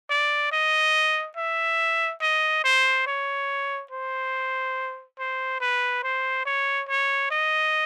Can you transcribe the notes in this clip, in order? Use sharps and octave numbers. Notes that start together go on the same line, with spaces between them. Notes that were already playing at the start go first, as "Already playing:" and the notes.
D5
D#5
E5
D#5
C5
C#5
C5
C5
B4
C5
C#5
C#5
D#5